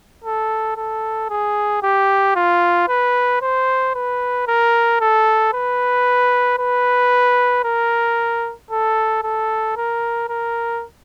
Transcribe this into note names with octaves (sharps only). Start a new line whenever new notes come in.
A4
A4
G#4
G4
F4
B4
C5
B4
A#4
A4
B4
B4
A#4
A4
A4
A#4
A#4